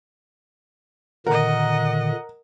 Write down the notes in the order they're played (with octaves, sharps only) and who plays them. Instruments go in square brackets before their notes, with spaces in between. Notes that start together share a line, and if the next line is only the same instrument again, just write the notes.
[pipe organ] A#2 D3 D#3 [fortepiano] A#4 [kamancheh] D#5 F#5